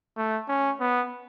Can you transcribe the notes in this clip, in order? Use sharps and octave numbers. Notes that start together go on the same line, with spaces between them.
A3
C#4
B3